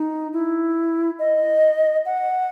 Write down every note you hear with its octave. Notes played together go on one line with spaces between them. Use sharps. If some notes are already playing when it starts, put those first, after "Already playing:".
Already playing: D#4
E4
D#5
F#5